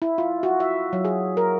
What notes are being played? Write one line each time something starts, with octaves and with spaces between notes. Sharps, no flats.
E4
F4
F#4
E5
F#3
G#4
A#4